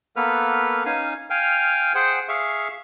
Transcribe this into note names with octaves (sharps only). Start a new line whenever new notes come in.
A#3 B3 A4 B4 F6
C#4 D#4 F5 G#5
F5 G5 G#5 F6
G#4 C5 F#5 G5
G#4 E5 F5 C#6